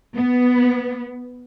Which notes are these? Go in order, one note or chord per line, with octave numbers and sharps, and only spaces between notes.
B3